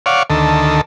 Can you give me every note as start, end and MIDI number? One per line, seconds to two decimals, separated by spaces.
0.06 0.23 73
0.06 0.23 74
0.06 0.23 77
0.06 0.23 78
0.30 0.81 38
0.30 0.81 51
0.30 0.81 69